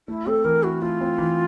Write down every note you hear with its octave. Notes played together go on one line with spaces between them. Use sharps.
A3 E4
C4 A4
E3 A#4
E4 F#4
A3 F4
C4
E3